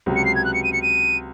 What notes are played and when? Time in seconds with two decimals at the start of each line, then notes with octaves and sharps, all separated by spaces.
0.06 C#2 C3 F#3
0.16 C#7
0.25 C7
0.35 G#6
0.45 F#6
0.54 C#7
0.64 D#7
0.73 C#7
0.82 D#7